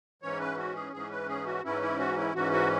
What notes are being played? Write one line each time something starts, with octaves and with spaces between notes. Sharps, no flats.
G#2 E3 C#4 C#5
B4
F#4
G#4
G#2 E3 C#4 G#4
B4
G#4
F#4
G#2 E3 C#4 E4
E4
F#4
E4
G#2 E3 C#4 F#4
F#4